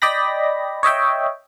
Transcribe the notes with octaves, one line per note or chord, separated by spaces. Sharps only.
D5 D#5 G5 B5 A#6
C#5 D#5 E5 G5